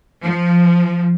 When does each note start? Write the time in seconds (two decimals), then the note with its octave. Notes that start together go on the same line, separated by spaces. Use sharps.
0.23 F3